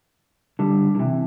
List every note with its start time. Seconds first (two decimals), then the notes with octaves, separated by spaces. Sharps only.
0.59 D3 G3
0.95 D3
0.99 C3 E3